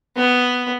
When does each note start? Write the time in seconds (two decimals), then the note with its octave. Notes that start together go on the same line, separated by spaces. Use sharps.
0.16 B3